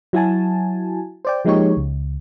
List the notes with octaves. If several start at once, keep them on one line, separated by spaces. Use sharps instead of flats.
F#3 E4 F#4 G#5 A5
C5 D5 G5
F3 G#3 A#3 D#4 G4 C#5
C#2